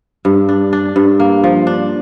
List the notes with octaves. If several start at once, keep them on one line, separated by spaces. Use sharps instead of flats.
G2
D4
D4
G2
A#3
F3
D4